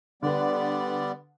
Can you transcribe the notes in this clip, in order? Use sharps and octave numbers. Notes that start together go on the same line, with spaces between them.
D3 G3 B3 B4 D5